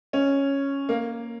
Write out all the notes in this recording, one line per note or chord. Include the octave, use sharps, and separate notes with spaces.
C#4
A#3